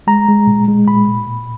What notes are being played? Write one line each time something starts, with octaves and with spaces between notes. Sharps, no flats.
G#3 A#5
G#3
A#2
G#3
A#2 B5
A#2
A#2